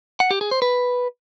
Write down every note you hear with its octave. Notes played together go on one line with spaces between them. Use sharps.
F#5
G4
G#4
C5
B4